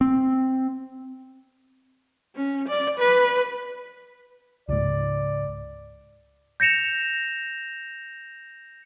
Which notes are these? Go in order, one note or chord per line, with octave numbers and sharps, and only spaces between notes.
C4
C#4
D5
B4
C#2 G#2 D5
G6 A#6 C#7 E7 F7